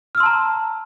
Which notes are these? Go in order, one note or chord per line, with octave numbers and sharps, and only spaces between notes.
A5 A#5 C6 E6 F6